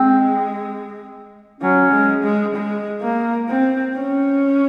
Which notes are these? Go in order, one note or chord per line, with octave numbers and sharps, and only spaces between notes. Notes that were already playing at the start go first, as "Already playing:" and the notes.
Already playing: G#3 C4
F#3 C#4
G#3
G#3
G#3
A#3
C4
C#4